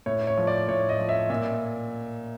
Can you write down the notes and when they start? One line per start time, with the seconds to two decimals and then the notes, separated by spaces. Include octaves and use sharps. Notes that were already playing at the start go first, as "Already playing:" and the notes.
0.06 A2 C#5
0.27 C#5
0.37 F3
0.47 D5
0.68 A2 C#5
0.89 D#5
0.99 F3
1.09 E5
1.30 A#2 E5